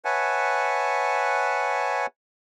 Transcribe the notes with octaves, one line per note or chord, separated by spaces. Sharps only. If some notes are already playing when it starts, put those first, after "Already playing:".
B4 C#5 E5 F#5 G#5 A5